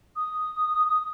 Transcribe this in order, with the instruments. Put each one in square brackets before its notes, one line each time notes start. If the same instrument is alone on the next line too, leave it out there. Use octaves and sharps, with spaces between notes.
[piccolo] D#6